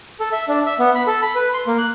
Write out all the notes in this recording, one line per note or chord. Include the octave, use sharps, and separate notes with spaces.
A4
E5
D4
E5
B3
B5
A4
B5
B4
C6
A#3
F#6